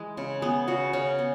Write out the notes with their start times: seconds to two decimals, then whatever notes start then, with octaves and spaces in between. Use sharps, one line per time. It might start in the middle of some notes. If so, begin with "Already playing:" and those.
Already playing: E3 G#3 B4
0.17 C#3
0.42 B3 G#4
0.68 C#3 F#4
0.93 C#3 C#4
1.19 B3